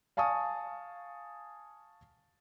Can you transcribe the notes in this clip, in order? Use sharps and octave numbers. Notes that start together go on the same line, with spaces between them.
F5 G#5 A5 C#6 D#6